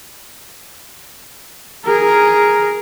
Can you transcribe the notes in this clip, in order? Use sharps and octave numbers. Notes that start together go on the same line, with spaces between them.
G#4 A#4